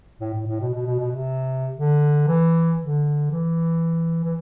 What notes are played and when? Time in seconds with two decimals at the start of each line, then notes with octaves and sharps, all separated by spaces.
0.21 A2
0.34 A2
0.47 A2
0.60 B2
0.74 B2
0.86 B2
0.99 B2
1.11 C3
1.77 D3
2.28 E3
2.80 D3
3.31 E3
4.24 E3